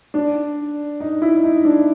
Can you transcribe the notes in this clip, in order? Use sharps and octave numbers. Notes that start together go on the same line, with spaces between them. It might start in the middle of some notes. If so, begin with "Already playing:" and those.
D4
D#4
E4
D#4
D4